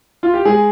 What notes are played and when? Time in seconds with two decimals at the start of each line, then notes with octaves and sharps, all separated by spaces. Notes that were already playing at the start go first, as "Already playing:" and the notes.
0.23 F4
0.34 G4
0.45 G#3 G#4